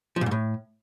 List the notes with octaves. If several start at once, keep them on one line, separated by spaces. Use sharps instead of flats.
F3
A#2
G#2
A2